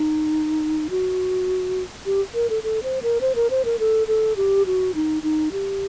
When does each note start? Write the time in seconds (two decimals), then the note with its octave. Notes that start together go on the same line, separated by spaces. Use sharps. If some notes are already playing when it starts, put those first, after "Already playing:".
Already playing: D#4
0.90 F#4
2.06 G4
2.34 A#4
2.50 A4
2.63 A4
2.83 C5
3.02 A#4
3.21 C5
3.35 A#4
3.50 C5
3.65 A#4
3.79 A4
4.08 A4
4.36 G4
4.66 F#4
4.95 D#4
5.23 D#4
5.52 G4